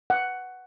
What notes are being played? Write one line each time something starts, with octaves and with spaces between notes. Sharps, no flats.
F#5